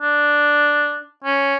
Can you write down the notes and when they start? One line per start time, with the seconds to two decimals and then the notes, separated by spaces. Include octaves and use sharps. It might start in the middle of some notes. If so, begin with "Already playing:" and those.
0.02 D4
1.24 C#4